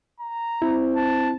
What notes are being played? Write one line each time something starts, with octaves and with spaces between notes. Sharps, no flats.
A#5
C4 E4
A5